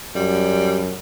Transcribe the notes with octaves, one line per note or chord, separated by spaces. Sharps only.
F#2 G3